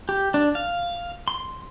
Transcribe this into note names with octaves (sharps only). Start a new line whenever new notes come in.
G4
D4
F5
C6